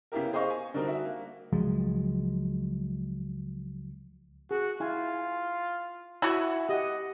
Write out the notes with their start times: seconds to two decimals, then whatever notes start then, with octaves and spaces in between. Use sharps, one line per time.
0.12 C#3 A#3 B3 E4 G4 A#4
0.33 G#4 C5 D#5 F5 C#6
0.50 G#5
0.74 D3 G3 C4 D#4 F#4 A#4
0.87 F#4 E5
1.05 A#3
1.53 C#2 F3 F#3 G#3
4.51 F#4 G#4
4.80 E4 F4 G#5
6.22 E4 F#4 G#5
6.69 G4 D#5 F#5